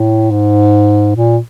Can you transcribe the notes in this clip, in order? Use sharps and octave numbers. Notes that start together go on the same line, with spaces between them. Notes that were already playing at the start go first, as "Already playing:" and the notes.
Already playing: A2
G#2
A#2